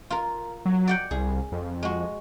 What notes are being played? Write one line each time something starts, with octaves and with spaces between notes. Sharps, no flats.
F4 A#4
F#3
D5 F#5 G5
C2 G#4
F2
G#3 F#4